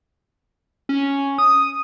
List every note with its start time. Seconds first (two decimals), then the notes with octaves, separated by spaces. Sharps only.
0.89 C#4
1.38 D#6